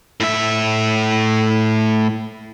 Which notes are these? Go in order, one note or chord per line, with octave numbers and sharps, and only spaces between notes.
A2 E5